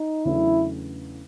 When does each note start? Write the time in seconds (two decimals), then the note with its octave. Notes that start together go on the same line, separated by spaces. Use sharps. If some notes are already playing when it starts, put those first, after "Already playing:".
Already playing: D#4
0.25 E2 C#3 F#3 A3 D4 E4